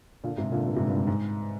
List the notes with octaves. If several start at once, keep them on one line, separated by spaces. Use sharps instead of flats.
A#2 D3
G#2 C3
A#2 D3
G2 A#2
G#2 C3
G2
G#2
G#2